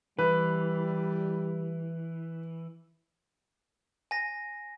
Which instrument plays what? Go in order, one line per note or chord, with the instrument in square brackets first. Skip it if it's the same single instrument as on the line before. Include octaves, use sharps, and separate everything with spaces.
[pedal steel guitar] E3 [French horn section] G3 [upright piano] B4
[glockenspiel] G#5 A#6